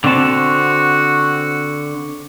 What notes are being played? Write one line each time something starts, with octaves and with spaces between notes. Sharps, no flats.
D3 C4 F#4 A5